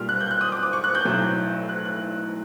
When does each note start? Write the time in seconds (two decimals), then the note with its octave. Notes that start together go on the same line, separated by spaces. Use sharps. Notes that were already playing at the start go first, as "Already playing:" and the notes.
Already playing: B1 A#2 G3 F6
0.09 F#6
0.20 G6
0.31 F#6
0.41 D#6
0.52 D6
0.63 D6
0.73 C#6
0.84 F#6
0.95 G6
1.05 B1 A2 F#3
1.69 F#6
1.85 F#6